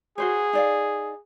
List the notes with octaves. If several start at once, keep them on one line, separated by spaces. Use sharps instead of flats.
F#4 G#4 C5 C#5
D#4 D5 F5